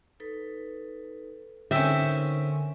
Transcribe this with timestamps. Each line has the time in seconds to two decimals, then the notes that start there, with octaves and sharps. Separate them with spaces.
0.20 D#4 A4 B4
1.71 D3 C4 C#4 D#4 A4 A#4 E5